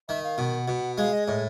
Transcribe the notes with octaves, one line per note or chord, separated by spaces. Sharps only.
D#3 E5
F5
B2 F#5
B2
G#3 F5
D#5
A2 D#5